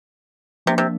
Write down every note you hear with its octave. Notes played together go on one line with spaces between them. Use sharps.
C3 F3 A#3 D4
C3